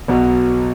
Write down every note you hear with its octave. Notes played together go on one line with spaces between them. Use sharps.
B1 B2 F#3